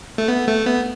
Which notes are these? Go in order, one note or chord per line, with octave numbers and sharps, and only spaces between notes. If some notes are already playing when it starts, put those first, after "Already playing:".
A3
B3
A3
B3